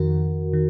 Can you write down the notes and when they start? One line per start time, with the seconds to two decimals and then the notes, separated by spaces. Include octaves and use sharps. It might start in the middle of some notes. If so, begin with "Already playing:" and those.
Already playing: F2 D#3 F#4 A#4
0.53 D#3